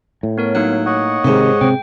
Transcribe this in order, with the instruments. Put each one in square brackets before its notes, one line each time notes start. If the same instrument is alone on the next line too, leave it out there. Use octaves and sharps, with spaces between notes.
[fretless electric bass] A2
[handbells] B3 A#4 C#5
[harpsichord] F#3 [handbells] A#3 D#4 F#6
[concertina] C#5 D#5 F#5
[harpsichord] G#2 G4 [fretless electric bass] C3 D#3
[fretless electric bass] C3 C4 [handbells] G5